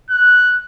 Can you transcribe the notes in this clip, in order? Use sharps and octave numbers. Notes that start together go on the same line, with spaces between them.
F#6